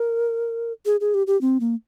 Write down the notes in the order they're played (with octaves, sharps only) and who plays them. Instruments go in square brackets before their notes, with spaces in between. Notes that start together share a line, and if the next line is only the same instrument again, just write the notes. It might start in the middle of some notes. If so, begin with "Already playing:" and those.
Already playing: [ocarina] A#4
G#4
G#4
G4
G4
C4
A#3